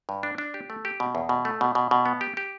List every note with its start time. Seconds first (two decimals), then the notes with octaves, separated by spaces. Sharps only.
0.09 G2
0.23 D4
0.38 D4
0.54 G4
0.70 A3
0.85 G4
1.00 B2
1.15 E2
1.29 B2
1.45 A3
1.61 B2
1.75 B2
1.91 B2
2.05 B3
2.21 G4
2.37 G4